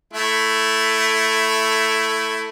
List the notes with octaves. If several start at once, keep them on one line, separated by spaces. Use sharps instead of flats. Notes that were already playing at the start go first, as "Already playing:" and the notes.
A3 E4